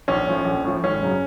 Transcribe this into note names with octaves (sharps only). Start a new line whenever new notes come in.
A#1 C#4
A2 F3
A#1
A2 F3
G#1 C#4
F#2 C#3 F#3